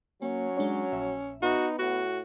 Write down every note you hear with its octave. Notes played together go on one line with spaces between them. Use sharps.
F#3 A#3 C#4
G#3 D4 C#5
A#1 E5
B3 D#4 F#4
A2 F#4 F#5